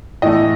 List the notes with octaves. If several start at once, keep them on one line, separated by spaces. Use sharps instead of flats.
A2 E3 A3 D#5